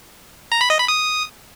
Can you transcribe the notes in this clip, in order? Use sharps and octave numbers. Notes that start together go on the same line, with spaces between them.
A#5
B5
D#5
B5
D#6